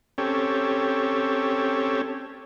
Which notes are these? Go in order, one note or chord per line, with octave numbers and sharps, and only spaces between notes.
C4 C#4 G4 A4 C#5